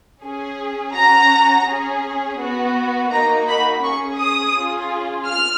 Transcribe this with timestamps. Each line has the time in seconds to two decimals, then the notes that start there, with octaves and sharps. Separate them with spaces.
0.23 C#4 G#4
0.95 C#4 F#4 A#5
1.67 C#4 G#4
2.39 B3 F#4
3.11 A#3 D#4 F#4 A#5
3.48 B5
3.84 C#4 G#4 C#6
4.19 D#6
4.56 C#4 F4 G#4
5.28 F6